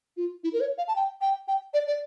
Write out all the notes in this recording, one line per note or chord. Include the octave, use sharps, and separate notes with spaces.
F4
E4
A#4
C#5
F5
A5
G5
G5
G5
D5
D5